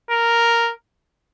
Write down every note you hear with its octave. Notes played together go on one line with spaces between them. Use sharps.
A#4